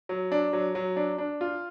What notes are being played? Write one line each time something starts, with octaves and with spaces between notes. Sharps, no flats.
F#3
D4
F#3
F#3
D4
D4
F4